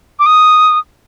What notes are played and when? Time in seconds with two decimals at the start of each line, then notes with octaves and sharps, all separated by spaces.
0.19 D6
0.26 D#6